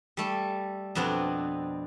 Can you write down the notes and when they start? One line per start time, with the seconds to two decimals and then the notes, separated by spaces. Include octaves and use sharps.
0.17 G3 A3 A4
0.95 F2 B2 B3 C4 D4